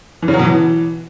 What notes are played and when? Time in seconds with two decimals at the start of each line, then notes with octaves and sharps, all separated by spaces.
0.22 E3
0.28 C#3
0.34 F#3
0.39 B2
0.45 E3